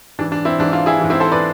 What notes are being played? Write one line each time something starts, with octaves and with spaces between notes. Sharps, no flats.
G#2 E3 D4
D4
C4 E4
G#2 E3 D4
D4 F4
E4 G#4
G#2 E3
C4 E4
A4 C5
B4 D5